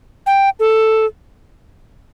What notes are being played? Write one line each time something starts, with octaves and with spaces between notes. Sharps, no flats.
G5
A4